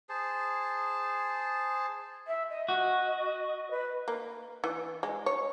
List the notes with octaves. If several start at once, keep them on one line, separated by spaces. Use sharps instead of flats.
G#4 C5 A5
E5
D#5
F#4
B4
A#3
E3
G#3
C#5